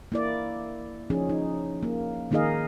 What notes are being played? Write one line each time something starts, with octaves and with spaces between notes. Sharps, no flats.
A#3 E4 D5
F3 C#4 D#4 G#4
D#4
A#3
D#3 A#3 D#4 G#4 D#5 F5